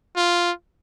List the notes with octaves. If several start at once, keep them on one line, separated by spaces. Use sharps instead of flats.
F4